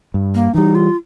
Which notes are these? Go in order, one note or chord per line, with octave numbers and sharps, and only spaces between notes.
G2
A#3
E3 G3 D#4
F4